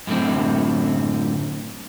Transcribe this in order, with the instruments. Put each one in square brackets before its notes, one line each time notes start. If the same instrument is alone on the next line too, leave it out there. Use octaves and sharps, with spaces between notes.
[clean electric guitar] F#2 A2 D3 C4